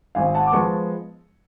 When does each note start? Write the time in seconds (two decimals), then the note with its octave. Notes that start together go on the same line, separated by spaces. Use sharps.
0.15 G#1 F5 G#5
0.34 F#5 A5
0.46 D6
0.52 F3 G#3 B3 A5 C#6